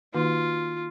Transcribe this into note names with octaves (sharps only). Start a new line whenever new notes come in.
D#3 A#3 D#4 F4 F#4 B4